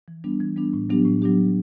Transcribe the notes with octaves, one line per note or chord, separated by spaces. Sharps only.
E3
G3 B3 D4
E3
G3 B3 D4
A2
F#3 B3 D4 G4
A2
F#3 B3 D4 G4